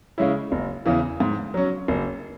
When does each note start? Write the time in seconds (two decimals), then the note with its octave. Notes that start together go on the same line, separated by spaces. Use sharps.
0.18 C#3 G#3 C#4 E4
0.52 F#1
0.86 E2 C#3 E3
1.20 G#2
1.54 F#3 C#4
1.88 F#1